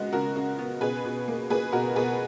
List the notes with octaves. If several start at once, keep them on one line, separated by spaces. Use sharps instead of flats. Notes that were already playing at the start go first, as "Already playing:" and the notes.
Already playing: C#3 G#3 B3 F#4
C#3 F#4 A#4
C#3
B3
B2 G#4 B4
B2
A#3
A#3 G#4 B4
B2 F#4 A#4
B2 G#4 B4